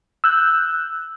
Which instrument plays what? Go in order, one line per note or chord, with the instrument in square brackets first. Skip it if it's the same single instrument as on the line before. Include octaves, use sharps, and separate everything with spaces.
[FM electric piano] E6 F#6 G6